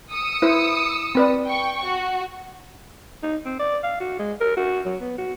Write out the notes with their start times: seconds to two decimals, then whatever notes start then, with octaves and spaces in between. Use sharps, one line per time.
0.12 D#6 E6 C#7
0.42 E4 B4 C5
1.15 C4 B4 D5
1.45 G5 C#6
1.85 F#4
3.23 D#4
3.45 C4
3.59 D5
3.83 F5
4.00 F#4
4.19 G#3
4.41 A#4
4.57 F#4
4.85 F#3
5.01 B3
5.18 F#4